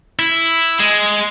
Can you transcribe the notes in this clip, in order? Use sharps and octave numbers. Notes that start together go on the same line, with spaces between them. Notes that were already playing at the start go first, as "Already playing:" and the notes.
E4
G#3